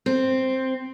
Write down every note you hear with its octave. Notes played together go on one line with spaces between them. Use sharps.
C4